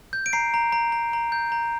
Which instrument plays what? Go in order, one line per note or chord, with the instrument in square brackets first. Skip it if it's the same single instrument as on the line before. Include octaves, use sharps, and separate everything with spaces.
[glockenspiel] G6
D7
A#5 C7
A#5
A#5
A#5
A#5
G6
A#5